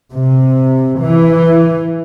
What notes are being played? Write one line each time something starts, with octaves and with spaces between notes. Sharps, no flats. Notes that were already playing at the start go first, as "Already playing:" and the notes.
C3
E3